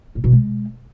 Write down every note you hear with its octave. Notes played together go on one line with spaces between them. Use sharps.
A#2
B2
G#3